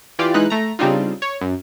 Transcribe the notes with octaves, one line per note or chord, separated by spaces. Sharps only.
E3 F4 G4 D5
E3 G#3 D#4 B4 F#6
A3 A#5
C#3 G3 C4 D4 D#4 F4
C#5
F#2